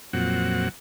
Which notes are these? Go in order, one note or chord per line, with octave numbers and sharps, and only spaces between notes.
F2 A#2 F#3 C4 F#5